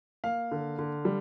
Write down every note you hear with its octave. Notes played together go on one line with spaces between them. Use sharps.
A#3 F5
D3
D3
G3